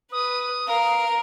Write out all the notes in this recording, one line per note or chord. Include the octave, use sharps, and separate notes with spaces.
B4 D#6
A#4 F5